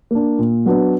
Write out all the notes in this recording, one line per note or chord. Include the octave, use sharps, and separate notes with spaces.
A#3 D4
A#2
F#3 B3 D4